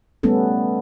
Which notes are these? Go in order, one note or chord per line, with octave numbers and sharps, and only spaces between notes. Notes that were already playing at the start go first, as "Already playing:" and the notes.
G3 A3 B3 C#4 A4